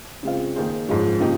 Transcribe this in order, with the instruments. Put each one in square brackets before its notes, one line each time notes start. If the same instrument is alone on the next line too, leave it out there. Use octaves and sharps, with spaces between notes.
[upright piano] C#3 G#3 C4 F4
D#3 A#3 D#4 G#4 C5
G#2 F3 G#3 C#4
C#3 F3 A#3 D#4 G4